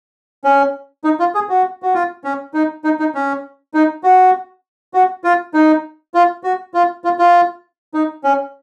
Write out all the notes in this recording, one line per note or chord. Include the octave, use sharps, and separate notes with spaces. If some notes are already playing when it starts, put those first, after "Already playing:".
C#4
D#4
F4
G#4
F#4
F#4
F4
C#4
D#4
D#4
D#4
C#4
D#4
F#4
F#4
F4
D#4
F4
F#4
F4
F4
F4
D#4
C#4